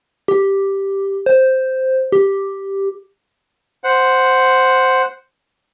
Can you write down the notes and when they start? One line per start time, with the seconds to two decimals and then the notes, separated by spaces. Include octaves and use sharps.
0.28 G4
1.26 C5
2.12 G4
3.84 C5 F#5